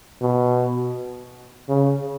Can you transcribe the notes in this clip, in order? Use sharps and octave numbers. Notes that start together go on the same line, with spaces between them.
B2
C#3